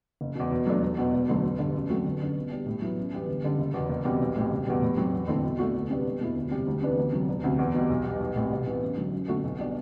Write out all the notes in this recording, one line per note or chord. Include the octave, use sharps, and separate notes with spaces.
F#1
E2 B2
B2
F#3 A3 D4
E1
E2 B2
E1
D2 D3 F#3
A1
G2 D3
F#2
F#3 A3 C4 F#4
G1
F#2 D3
B2
G3 D4 G4
A2
F#3 B3 E4
F#2
E3 G3 B3
G1
F#2 D3 G3
F#1
E2 B2
F#1
E2 B2 G3 C4
B1
A2 G3 C4
F#1
E2 B2 G3
A2
F#3 C4 F#4
E2
D3 A3 C4 E4
B2
A3 D4 F#4
D2
C3 G3 B3 D4
E1
E2 B2 A3 E4
D2
C3 G3
D2
C3 E3 B3 D4
D2
C3 F#3
E1
D2 C3
E2
B2 G3
B1
B2 G3
B1
A2 G3 C4
C2
C3 E3 B3
F#2
D3 F#3
F#2
D3 A3 C4 F#4
B1
B2 G3 D4 G4